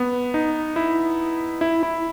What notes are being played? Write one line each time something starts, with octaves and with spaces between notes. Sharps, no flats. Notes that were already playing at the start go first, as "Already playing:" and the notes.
Already playing: B3
D#4
E4
E4
E4